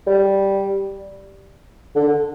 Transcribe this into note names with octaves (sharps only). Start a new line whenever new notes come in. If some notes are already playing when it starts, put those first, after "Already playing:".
G3
D3